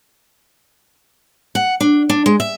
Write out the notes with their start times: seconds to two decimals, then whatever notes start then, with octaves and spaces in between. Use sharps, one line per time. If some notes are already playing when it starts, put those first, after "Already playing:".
1.55 F#5
1.81 D4
2.10 D4
2.26 G#3
2.40 E5